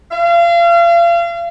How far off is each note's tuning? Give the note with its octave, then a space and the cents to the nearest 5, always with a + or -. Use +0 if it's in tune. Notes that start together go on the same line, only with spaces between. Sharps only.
F5 -35